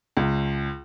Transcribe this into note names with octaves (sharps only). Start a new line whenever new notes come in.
C#2